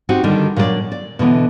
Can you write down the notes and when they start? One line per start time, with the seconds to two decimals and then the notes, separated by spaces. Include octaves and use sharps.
0.09 C4 D#4 F#4 G4
0.24 D3 D#3 G3
0.56 A#2 F#3 D4 A#4 D5
0.92 D5
1.19 B2 D3 E3 B3